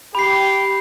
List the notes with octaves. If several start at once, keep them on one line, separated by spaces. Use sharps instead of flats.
G4 B5 C7